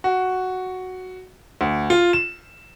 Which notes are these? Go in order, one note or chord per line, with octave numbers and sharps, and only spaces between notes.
F#4
D2
F4
E7